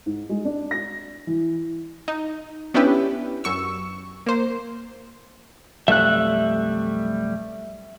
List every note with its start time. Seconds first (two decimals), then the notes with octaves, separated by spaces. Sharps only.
0.06 G#2
0.29 G#3
0.45 D4
0.71 A#6
1.27 E3
2.08 D#4
2.74 B3 C#4 D4 E4 G4 B4
3.44 F#2 C#6 E6
4.26 A#3 C5
5.88 B1 F2 G3 A3 E5 F#6